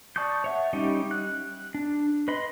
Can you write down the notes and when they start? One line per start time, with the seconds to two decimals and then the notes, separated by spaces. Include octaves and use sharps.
0.16 D5 A5 C#6 D#6 G6
0.44 C#5 E5 F#5
0.73 G3 C#4 D#4 G4
1.11 F#6
1.75 D4
2.28 B4 D#5 B5 C6